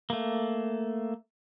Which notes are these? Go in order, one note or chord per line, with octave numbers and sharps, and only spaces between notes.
A3 A#3